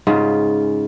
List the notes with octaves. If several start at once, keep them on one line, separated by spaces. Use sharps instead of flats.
G#2 C#3 F4